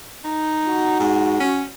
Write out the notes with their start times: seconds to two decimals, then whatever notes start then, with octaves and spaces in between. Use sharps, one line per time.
0.24 D#4
0.67 F#4
1.00 G#2
1.40 C#4